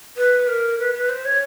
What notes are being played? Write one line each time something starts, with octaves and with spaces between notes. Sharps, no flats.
B4
A#4
B4
B4
C5
C#5